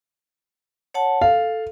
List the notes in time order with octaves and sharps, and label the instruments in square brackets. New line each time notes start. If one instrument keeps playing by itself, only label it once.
[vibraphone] C#5 F#5 A5
[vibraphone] A4 [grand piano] F5